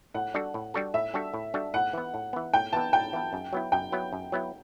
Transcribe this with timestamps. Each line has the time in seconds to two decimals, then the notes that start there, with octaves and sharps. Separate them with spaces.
0.14 A2 F#5
0.34 G3 D4 F#4 A4
0.54 A2
0.74 G3 D4 F#4 A4
0.94 A2 E5
1.14 G3 D4 F#4 A4
1.34 A2
1.54 G3 D4 F#4 A4
1.74 A2 F#5
1.93 E3 B3
2.14 A2
2.33 E3 B3
2.53 A2 G5
2.73 E3 B3 A5
2.93 A2 G5
3.13 E3 B3
3.33 F#2
3.53 F#3 B3 E4
3.72 F#2 G5
3.92 F#3 B3 E4
4.13 F#2
4.32 F#3 B3 E4